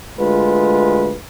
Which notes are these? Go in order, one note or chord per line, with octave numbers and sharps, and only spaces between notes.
D2 G#3 F4 B4